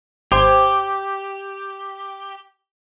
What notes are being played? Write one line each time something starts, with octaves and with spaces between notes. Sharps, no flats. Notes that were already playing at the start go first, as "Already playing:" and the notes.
G#1 G4 C5 G#6